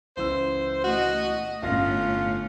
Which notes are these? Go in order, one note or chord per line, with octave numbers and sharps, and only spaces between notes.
C#2 E3 C5 E6
A3 F#4 D#5
G1 A2 C#4 F4 F5 A#6